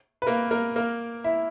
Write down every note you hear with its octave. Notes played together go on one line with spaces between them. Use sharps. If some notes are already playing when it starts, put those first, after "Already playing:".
B4
A#3 A#4
A#3 A#4
A#3 A#4
E4 E5